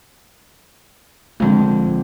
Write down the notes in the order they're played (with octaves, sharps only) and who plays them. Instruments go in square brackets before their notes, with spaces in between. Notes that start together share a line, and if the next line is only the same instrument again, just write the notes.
[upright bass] A#1 G#3 [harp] F2 D3 C4